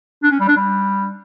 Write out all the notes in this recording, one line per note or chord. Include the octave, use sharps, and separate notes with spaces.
D4
C#4
G3
D4
G3